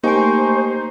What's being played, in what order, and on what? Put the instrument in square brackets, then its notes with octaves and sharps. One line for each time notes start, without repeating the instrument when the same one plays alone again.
[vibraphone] A3 G#5 C#6 [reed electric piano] A#3 G4 [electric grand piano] D#4 [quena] C5